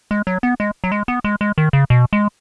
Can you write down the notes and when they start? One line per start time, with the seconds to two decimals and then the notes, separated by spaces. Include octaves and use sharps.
0.11 G#3
0.27 F#3
0.43 B3
0.60 G#3
0.84 F#3
0.92 G#3
1.08 B3
1.24 G#3
1.41 G#3
1.58 D#3
1.73 C#3
1.90 B2
2.13 G#3